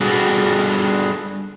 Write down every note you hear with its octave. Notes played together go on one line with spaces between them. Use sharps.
G3 B3 D4 F#4 G#4 A4